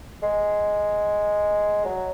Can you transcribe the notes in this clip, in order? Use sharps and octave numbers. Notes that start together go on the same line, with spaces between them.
G#3
F#3